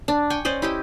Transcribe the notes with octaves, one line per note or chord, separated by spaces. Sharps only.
D4
G5 G#5 C#6
C#4 C5 D5 D#5
E4 G4 D#5